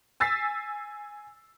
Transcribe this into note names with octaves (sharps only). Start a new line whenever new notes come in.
G#5 E6 A6 B6 C7